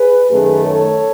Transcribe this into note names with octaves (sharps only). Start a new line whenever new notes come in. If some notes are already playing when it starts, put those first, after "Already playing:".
Already playing: G#4 B4
F#2 D#3 A3 G#4 B4
A4 C#5